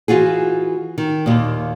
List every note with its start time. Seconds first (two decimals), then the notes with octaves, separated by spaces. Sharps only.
0.08 E3 F4 F#4 G#4
0.98 D#3
1.26 D#2 A#2